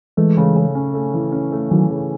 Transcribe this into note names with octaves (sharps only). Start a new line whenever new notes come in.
E3 G#3 A3
C#3
C#3
C#4
A3
E3
C#4
A3
D#3 E3 F#3
C#3